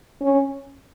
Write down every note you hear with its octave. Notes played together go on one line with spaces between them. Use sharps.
C#4